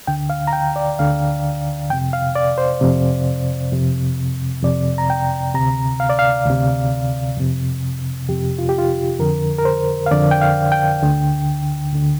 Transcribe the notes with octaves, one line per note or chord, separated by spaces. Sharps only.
D2 D3 G5
F5
A#5
G5
D5
D2 D3 F5
F2 C3 G5
F5
D5
C5
F2 C3
F2 C3
F2 C3 D5
A#5
G5
D2 C3 A#5
F5
D5
F5
D2 C3
F2 C3
F2 C3 G4
F4
G4
F4
F2 D3 A#4
A#4
C5
F5
F2 D3 D5
G5
F5
G5
D2 D3
D2 D3